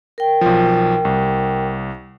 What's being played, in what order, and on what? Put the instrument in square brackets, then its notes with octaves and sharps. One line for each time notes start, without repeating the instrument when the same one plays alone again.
[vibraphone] A#4 G5
[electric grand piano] B1 F3
C2